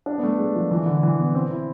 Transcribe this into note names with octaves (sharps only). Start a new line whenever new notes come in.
D4
B3
A3
G#3
F3
E3
D3
E3
B3
C4
E4